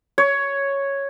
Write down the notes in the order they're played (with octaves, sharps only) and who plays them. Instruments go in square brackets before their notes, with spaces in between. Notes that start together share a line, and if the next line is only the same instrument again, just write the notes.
[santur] C#5